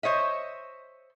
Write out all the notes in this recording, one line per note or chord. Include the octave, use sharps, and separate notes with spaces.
C5 C#5 D#5 E5